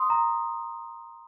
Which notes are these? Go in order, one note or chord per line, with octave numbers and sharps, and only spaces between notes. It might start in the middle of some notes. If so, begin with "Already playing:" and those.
Already playing: C6 D#6
A#5